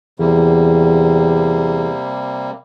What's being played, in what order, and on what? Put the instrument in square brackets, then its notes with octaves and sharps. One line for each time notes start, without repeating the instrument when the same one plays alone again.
[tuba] E2 [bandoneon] C3 G3 A#3